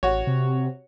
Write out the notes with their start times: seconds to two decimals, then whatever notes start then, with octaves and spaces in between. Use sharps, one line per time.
0.03 A1 F#4 C#5
0.27 C3